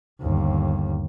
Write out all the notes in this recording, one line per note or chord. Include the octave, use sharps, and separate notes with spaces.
G1 D#2